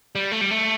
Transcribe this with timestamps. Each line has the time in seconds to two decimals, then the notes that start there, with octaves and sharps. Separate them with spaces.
0.15 G3
0.32 A3
0.41 G3
0.51 A3